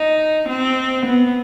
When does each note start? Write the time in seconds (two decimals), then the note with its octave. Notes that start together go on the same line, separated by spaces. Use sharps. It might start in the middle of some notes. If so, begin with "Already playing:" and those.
Already playing: D#4
0.49 C4
1.06 B3